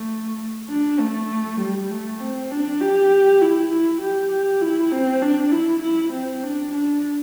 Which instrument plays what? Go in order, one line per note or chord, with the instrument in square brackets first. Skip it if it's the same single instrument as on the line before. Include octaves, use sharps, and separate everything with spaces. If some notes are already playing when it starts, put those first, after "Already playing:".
Already playing: [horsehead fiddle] A3
D4
A3
G3
A3
C4
D4
G4
E4
E4
G4
G4
E4
C4
D4
E4
E4
C4
D4
D4